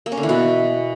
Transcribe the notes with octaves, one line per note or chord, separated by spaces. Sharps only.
A#3
C#4
D3
E3
B2